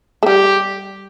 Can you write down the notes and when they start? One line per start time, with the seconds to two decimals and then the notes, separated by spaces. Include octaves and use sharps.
0.23 A3
0.26 G3 G4